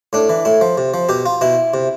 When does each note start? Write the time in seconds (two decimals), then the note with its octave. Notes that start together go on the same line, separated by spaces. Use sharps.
0.13 A2 D4
0.29 E3
0.45 A2 E4
0.61 F3
0.78 C3
0.94 F3
1.09 B2 G4
1.26 F4
1.41 B2 E4
1.74 C3